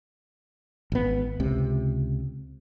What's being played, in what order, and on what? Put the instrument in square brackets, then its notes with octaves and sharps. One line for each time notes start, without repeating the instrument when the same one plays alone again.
[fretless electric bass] G#1 B3
C#2 C3